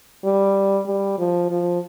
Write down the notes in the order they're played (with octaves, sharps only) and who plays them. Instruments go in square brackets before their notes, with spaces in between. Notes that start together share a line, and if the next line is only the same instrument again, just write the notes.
[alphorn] G3
G3
F3
F3